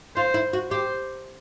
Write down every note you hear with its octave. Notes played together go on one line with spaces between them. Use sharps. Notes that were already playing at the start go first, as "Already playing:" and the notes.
F4 C5
E4
F#4
G4 C5